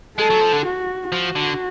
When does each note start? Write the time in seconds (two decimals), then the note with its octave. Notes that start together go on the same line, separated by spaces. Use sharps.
0.18 G#3 A4
0.30 F#3
0.41 F3
0.53 D3
0.65 F#4
1.12 F3 F#4
1.36 D3